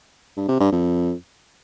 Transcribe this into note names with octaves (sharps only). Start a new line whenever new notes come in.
G2
C3
G2
F2